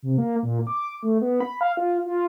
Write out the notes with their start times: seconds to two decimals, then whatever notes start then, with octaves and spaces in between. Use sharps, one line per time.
0.02 C3
0.18 A#3
0.43 A#2
0.67 D6
1.03 A3
1.21 B3
1.40 B5
1.61 F5
1.77 F4
2.06 F4